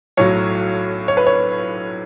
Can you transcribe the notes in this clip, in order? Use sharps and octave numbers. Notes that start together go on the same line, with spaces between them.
B1 A2 F#3 C#5
C#5
B4
C#5